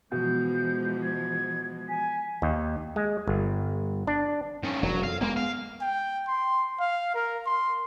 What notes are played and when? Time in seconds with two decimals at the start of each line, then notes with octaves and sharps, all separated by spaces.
0.12 B2 E3 F3 G#3 G6
1.03 G#6
1.89 G#5 B6
2.42 D#2
2.96 G#3
3.27 G1
4.07 D4
4.64 D#3 C#4
4.82 E1 F#3
5.04 F2 F5
5.21 G#3 A#3 B3
5.37 F5
5.81 G5
6.28 C6
6.80 F5
7.15 A#4
7.46 C6